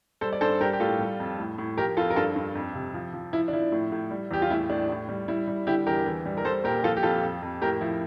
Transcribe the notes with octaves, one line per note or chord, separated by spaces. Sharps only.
G3 A4 C5
D5
G2 A4 C5
G3 G4 A#4
G4
A2 F4 A4
G3
F2
A2
A2
F3 G4 A#4
F2 F4 A4
A#4
G2 F4 A4
G2
F2
C3
F3
F3
F3 E4
D4
F3 E4
A2
A2
G3
E2 G4
F4
A2 E4
A2 D4
A2
G3
G3 E4
G3
D3 E4 G4
E2 G4 A#4
E3
G3
A#4
G3 A4 C5
A#2 G4 A#4
F3 F4 A4
G4
F2 F4 A4
F2
F2
A2 G4 A#4
F3 E4